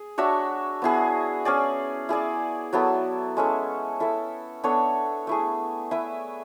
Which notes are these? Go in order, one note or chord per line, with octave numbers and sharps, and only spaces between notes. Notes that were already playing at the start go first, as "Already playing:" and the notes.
Already playing: G#4
D4 F#4 C#5 E5
B3 E4 G#4
C#4 G#4 D5
E4 G#4 D5
F#3 B3 E4 A4
G#3 C#4 E4 A4
E4 A4 E5
B3 D4 A4 C#5
A3 E4 G#4
E4 B4 E5